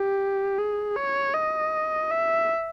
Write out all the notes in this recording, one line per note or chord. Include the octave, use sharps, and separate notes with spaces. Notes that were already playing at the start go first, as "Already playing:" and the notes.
Already playing: G4
G#4
C#5
D#5
E5